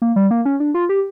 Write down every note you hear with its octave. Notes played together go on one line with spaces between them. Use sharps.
A#3
G3
A#3
C#4
D4
F4
G4